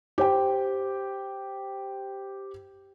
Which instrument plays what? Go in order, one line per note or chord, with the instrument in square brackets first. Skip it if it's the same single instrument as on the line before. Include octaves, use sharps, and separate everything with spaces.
[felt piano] G4 C5 G5